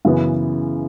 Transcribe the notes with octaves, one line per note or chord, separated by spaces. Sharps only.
F#2 C#3 E3 B3